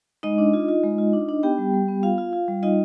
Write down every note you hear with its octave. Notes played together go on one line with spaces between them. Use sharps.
G#3 D#4 D#5
D4
F4
F4
G#3
F4
D4
D4
B3 G4 G5
G3
G3
B3
F4 F5
F4
F4
G3
D#4 F4 D#5